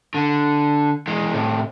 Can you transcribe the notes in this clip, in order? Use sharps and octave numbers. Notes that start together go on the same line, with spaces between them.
D3
E3 G#3
A2 C3